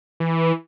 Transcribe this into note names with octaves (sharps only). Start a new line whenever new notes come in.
E3